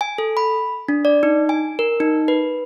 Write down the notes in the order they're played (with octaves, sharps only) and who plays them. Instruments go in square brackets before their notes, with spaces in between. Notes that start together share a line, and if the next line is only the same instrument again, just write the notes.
[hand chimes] G#5
A4
B5
D4
D5
D#4
G#5
A#4
D#4
B4